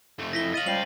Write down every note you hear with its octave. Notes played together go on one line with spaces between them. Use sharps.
F2 A3
E4 A#6 B6 G7
D#5 F5 A6 D#7 F#7
C#2 F3 G3 F5 G5 F#7